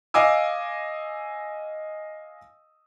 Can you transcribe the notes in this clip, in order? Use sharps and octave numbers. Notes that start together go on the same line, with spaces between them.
D#5 F5 G#5 D6 E6